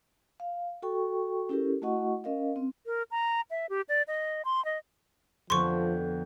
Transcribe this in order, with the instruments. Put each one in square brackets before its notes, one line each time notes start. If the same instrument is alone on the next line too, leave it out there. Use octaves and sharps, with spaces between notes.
[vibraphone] F5
F#4 A4 G5 C#6
C#4 E4 G4 A4 A#4
A3 E4 F#4 D#5 F#5 C#6
C#4 A#4 D#5 F5
C4
[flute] A#4
A#5
E5
G4
D5
D#5
C6
D#5
[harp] F2 D3 B3 [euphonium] F3 [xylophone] C6 C#6